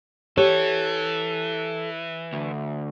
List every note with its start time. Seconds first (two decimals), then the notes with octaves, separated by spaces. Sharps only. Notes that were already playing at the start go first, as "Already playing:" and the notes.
0.38 E3 G4 A4 C#5
2.33 D2